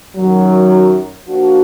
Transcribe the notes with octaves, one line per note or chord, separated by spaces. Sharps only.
F#2 D#3 F#3
F3 A#3 D4 F#4